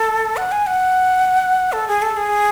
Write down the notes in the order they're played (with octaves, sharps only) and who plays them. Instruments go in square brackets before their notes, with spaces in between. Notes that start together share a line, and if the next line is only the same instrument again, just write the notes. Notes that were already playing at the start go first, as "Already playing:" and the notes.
Already playing: [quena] A4
F#5
G#5
F#5
A4
G#4
A4
G#4